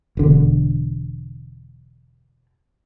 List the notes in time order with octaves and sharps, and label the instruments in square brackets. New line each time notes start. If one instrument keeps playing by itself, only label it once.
[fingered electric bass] E1 D3